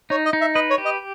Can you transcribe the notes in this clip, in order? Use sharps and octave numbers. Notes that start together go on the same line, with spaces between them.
D#4 C#5
D#5
D#4
E5
B4 D#5
C#5
G4
D#5